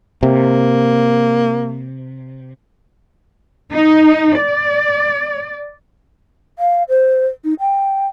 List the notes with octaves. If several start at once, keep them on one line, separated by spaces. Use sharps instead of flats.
C3 A#3
D#4
D5
F5
C5
D#4
G5